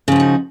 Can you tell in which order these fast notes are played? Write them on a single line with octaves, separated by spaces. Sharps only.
C#3 F3 F#4 D#4